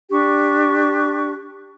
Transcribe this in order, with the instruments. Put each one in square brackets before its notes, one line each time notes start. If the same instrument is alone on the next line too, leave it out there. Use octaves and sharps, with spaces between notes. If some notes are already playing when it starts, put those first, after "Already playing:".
[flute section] D4 G4 C#6